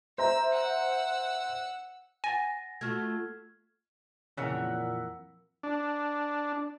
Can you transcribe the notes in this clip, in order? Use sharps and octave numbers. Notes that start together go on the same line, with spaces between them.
C5 E5 A#5 E6
F#5 E6
F#5 G#5 A6 A#6
A3 F4 F#4 F6 G#6
F2 A#2 C#3 E3 A#4 C#5 E5 F#5
D4